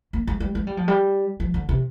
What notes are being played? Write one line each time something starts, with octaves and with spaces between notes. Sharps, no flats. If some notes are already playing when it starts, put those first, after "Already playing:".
A#3
G#3
G3
G#3
G3
F3
G3
F3
D3
C3